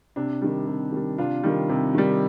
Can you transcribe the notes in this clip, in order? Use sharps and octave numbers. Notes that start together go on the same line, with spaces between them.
C3 D4
D#3 G3
C3
D#3 G3
C3 D4 F4
D#3 G3
C3
D#3 G3